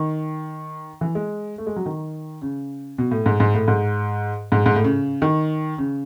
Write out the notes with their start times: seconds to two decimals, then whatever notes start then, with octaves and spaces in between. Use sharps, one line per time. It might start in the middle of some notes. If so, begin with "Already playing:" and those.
Already playing: D#3
1.01 E3
1.15 G#3
1.58 A3
1.67 G#3
1.76 F#3
1.86 D#3
2.42 C#3
2.98 B2
3.11 A2
3.26 G#2
3.40 G#2
3.54 A2
3.68 G#2
4.52 G#2
4.66 G#2
4.76 A2
4.84 C#3
5.22 D#3
5.78 C#3